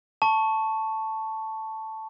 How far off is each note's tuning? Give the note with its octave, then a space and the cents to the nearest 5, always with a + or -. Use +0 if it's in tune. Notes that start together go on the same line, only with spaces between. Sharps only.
A5 +0 C#6 +0